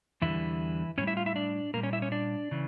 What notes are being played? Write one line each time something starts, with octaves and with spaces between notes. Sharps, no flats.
E2 D3 E3 G3 E4
A2 G3 C#4 C#5
E4 E5
F4 F5
E4 E5
D4 D5
A#2 G3 A#3 A#4
C#4 C#5
E4 E5
C#4 C#5
D4 D5
C#3 E3